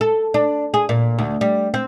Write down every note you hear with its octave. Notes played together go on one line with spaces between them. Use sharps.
A4
D4
G#4
A#2
D2
G3
C4